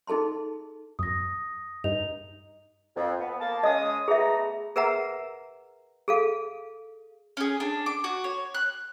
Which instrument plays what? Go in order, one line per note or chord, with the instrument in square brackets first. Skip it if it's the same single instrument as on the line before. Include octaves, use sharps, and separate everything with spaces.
[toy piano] D#4 G#4 A4 A5 C6
[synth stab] F#2 [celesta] D#6 A#6
[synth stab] G2 [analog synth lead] D#4 [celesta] F7
[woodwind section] F2
B3
A#3 A5
[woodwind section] G#3 C#4 D#6 [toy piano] D#5
[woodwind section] A3 B3 A#5 [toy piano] G#4 E5
[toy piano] G#4 A#4 B4 E5 F#5 A#5
G#4 A4 F5
[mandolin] C#4 G#4
D4
D6
F#4
C#5
F#6